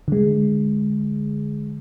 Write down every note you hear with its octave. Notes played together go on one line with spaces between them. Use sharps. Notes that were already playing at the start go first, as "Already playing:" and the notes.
D3 G#3